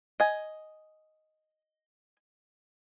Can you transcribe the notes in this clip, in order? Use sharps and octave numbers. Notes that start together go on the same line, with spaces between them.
D#5 G#5